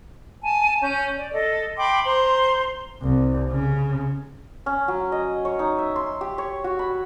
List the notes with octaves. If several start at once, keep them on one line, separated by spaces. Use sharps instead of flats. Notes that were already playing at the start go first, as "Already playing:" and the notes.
G#5 A5
C#4 G6
D5
A4 D#5
G5 B5 C6 D6
C5 A#5 C6
C2
C#3
C#4
F#3
D#5
C#5
D#4
E5
C6
G4
C#5
F#4
B5